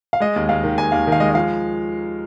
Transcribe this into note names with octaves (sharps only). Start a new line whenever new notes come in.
F5
G#3 D#5
D#2
D#2 F5
D#3
D#2 G#5
D#2 F5
D#3
F5
G#3 D#5
D#5
F3 F5